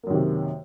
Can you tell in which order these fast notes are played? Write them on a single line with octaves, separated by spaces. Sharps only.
A#3 F#2 D#3 C3